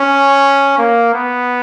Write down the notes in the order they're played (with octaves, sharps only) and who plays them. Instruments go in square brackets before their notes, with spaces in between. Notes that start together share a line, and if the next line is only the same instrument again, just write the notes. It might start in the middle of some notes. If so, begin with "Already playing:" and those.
Already playing: [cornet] C#4
A#3
B3